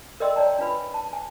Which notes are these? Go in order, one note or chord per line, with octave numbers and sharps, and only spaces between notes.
A#4 D5 D#5 G5 C6 E6
C#5 D5 G5 A5 A#5
D4 F4 B4 B5
A5
G#5